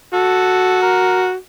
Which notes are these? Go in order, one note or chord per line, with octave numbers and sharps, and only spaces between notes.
F#4 A4
A#4